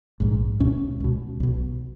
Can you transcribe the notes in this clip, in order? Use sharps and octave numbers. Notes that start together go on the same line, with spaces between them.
A#1 G#2
C#2 B2 C#4
C#2 B2
B1 B2